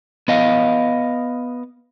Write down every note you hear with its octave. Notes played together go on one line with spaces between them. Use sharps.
B3 D#5 F5